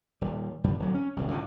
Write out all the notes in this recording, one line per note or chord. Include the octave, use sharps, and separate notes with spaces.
D#1 G3
F#2 D3 G3
D1 F#3
C#4
D#1 C2
C#2 A2 D3